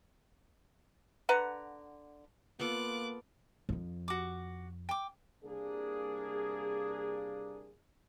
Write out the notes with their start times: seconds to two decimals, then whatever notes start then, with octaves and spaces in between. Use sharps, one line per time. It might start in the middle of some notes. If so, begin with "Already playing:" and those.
1.29 D3 B4 F#5 A#5
2.60 A#3 B3 F4 A4 D6 F#6
3.69 F2 F3
4.08 F#4 D6
4.89 G5 D6
5.44 C2 A#3 D4 G#4